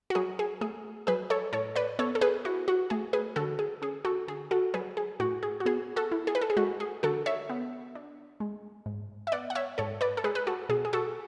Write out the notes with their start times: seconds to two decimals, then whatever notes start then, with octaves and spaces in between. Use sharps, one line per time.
0.10 F#4
0.15 F#3 G#4
0.39 G#4
0.61 A3 G#4
1.07 F#3 G#4 B4
1.30 A4 C#5
1.53 A2 A4 C#5
1.76 B4 D5
1.99 B3 A4 C#5
2.15 A4
2.21 G#4 B4
2.45 E4 F#4
2.68 F#4
2.90 A3 G#4
3.13 G#4 B4
3.36 D3 F#4 A4
3.59 G#4
3.82 C#4 G#4
4.05 F#4 A4
4.28 D3 G#4
4.51 F#4 A4
4.74 F#3 G#4 B4
4.97 G#4
5.20 A2 F#4
5.43 G#4
5.60 F#4
5.66 B3 G#4
5.96 F#4 A4
6.12 E4
6.27 G#4
6.35 B4
6.41 A4
6.50 G#4
6.57 G#3 F#4
6.80 G#4
7.03 D3 F#4 A4
7.26 C#5 E5
7.49 B3
7.95 D4
8.40 G#3
8.86 G#2
9.27 E5
9.32 B3 D5 F#5
9.50 F#5
9.55 C#5 E5
9.78 G#2 A4 C#5
10.01 B4 D5
10.17 A4
10.24 G#3 G#4 B4
10.35 B4
10.47 F#4 A4
10.69 B2 G#4
10.85 G#4
10.93 F#4 A4